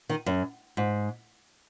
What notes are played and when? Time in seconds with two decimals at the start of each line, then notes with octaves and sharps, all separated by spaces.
0.09 D#3
0.26 F#2
0.77 G#2